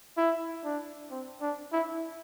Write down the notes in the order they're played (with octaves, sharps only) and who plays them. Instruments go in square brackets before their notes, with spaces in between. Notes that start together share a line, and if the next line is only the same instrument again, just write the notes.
[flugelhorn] E4
D4
C4
D4
E4